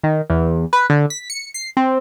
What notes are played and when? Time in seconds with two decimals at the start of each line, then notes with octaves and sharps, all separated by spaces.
0.04 D#3
0.30 E2
0.73 B4
0.90 D3
1.10 B6
1.30 C#7
1.54 C7
1.77 C4